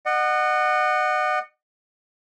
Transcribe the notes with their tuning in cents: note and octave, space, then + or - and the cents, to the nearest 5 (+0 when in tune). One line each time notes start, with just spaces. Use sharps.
D#5 -35 F#5 +0